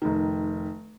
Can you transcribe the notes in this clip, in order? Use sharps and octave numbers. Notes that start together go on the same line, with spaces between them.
F1 D#3